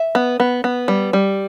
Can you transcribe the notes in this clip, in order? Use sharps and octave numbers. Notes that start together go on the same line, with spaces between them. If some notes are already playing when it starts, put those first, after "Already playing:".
Already playing: E5
B3
B3
B3
G3
G3